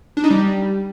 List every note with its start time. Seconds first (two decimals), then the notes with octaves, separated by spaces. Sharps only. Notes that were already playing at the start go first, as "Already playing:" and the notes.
0.17 D4
0.24 D#4
0.31 G3